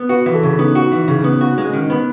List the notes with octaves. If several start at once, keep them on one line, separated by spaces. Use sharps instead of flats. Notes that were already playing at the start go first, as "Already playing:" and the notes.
Already playing: B3
F#4 B4
E3
A4
C#3
B3 D#4
F#4
E3
C#3
B3
F#4
G#3 C#4
D#3
D#4
B3